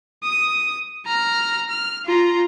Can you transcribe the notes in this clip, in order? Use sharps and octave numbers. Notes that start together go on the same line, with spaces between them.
D#6
A#5 F6
F6
F4 A#5